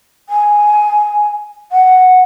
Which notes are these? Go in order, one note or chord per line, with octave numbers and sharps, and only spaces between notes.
G#5
F#5